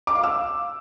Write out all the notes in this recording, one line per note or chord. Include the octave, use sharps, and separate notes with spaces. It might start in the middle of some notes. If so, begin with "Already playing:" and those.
D6
F5
E6